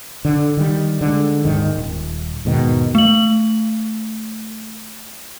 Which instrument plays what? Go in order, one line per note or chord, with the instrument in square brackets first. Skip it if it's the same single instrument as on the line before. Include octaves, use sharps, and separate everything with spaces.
[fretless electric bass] D3
D#3 G3
D3 G#3
D#1 C#2 G#2 D#3
D#1
E2 G#2 B2 D#3
[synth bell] A3 F#7